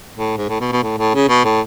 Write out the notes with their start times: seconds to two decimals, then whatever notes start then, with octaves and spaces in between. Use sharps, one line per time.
0.14 A2
0.37 G#2
0.49 A2
0.60 B2
0.72 B2
0.83 A2
0.98 A2
1.15 C#3
1.29 B2
1.45 A2